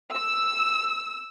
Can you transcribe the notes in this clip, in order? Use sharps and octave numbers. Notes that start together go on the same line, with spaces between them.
E6